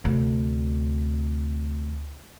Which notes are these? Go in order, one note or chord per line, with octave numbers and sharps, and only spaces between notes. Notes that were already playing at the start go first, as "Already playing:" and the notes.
D2 C3